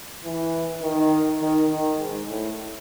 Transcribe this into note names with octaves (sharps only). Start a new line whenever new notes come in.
E3
D#3
D#3
D#3
G#2
A2